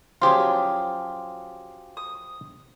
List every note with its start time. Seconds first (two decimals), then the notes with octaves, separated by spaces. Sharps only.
0.22 F3 F#3 C#4 F4 G4 G#4 C6
1.97 D#6